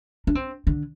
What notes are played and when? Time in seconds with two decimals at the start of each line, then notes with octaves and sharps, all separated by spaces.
0.27 D4
0.35 C4
0.67 D3